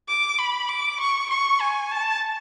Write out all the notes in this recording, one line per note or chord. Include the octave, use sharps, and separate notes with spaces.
D6
B5
D6
C#6
C#6
G#5
A5